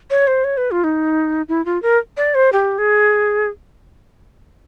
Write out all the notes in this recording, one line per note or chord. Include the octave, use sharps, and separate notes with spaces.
C#5
C5
C#5
B4
F4
D#4
E4
F4
A#4
D5
C5
G4
G#4